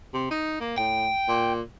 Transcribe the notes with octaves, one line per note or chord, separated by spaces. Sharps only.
C3
D#4
A#3
A2 G5
A#2